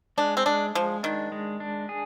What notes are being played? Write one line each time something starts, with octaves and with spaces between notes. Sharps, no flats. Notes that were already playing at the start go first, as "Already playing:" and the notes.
G#3 D4
C4
G#3 D4
F3 G#3
D#3 D4
G#3
D4
G#4